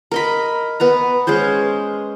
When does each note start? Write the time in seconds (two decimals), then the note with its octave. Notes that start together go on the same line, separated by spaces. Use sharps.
0.11 A#4 D#5 B5
0.80 B3 B4 A#5
1.27 G#3 C#4 G#4 C5